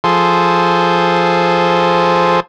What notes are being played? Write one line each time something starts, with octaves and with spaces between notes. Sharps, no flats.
F3 G#4 A4 C5